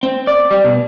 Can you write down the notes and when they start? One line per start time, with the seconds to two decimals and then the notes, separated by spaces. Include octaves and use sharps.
0.03 C4
0.27 D5
0.51 G3
0.64 B2